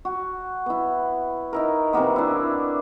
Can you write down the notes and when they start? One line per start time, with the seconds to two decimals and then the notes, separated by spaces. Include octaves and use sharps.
0.05 F#4
0.66 B3 E4
1.53 D#4 E4 A#4
1.93 C3 E3 A#3 B3
2.16 D4 E4